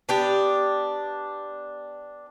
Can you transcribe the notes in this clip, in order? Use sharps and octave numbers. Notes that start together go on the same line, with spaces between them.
B3 D4 G4 G5